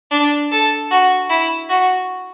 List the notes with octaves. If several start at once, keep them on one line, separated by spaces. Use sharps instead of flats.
D4
A4
F#4
E4
F#4